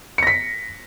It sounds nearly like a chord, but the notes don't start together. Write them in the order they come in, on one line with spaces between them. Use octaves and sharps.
C#7 A#6 B6